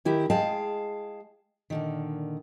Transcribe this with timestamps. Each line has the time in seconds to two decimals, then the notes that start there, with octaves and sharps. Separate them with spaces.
0.05 D#3 E4 G4
0.30 G#3 G#4 F5 G5 A5
1.70 A#2 D3 D#3